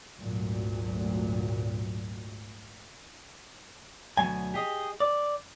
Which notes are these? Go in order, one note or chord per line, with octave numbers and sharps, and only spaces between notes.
G#1 D2 A#2 F#3
D2 B2 F#3 G#5
G4 G#4 D#5
D5